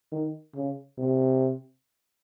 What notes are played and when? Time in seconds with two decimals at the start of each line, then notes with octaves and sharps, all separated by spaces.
0.12 D#3
0.55 C#3
0.98 C3